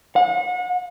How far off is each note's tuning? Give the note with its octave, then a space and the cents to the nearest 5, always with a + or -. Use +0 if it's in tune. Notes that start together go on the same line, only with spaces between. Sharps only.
F#5 -35